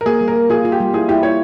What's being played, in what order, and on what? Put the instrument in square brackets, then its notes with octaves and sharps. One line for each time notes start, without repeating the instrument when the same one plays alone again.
[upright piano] A#4
[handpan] A#3 [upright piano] G#4
[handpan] G3
[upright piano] A#4
[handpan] A#3
[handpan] F4 [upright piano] G#4
[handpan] F4
[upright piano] G4
[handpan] G3
[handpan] E4 [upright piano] G#4
[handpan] E4 [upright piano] G4
[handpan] E4 [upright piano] C#5